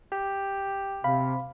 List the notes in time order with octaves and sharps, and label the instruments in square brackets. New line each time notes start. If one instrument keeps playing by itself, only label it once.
[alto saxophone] G4
[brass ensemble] C3 [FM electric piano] F5 [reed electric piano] B5